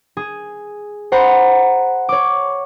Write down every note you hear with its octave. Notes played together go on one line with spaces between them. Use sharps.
G#4
C5 F#5 A#5 B5
C#5 D6